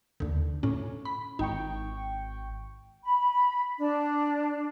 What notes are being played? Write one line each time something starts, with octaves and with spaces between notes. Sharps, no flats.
D#2 D3
A2 C#4
B5
G#1 D#4 G5 C#6
B5
D4